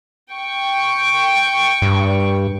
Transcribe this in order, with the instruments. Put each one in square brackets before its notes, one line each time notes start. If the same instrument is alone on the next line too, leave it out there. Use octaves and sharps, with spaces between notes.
[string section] G5 C#6
[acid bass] G2